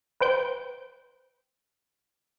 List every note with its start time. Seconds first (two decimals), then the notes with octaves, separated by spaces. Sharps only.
0.20 B4 C5 G5 G6